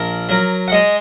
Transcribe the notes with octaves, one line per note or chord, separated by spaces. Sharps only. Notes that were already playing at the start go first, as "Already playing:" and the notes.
Already playing: A#1 A#4
F#3 A#4
F#5
G#3 D#5